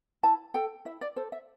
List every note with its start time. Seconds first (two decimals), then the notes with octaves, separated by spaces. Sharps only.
0.23 E4 A5
0.54 A4 G5
0.85 E4 E5
1.01 D5
1.16 A4 C5
1.32 E5